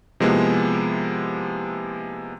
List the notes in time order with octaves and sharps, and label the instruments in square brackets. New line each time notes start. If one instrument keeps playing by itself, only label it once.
[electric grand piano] C3 F3 G#3 A#3 B3 E4